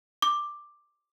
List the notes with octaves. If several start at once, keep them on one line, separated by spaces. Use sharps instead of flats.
D6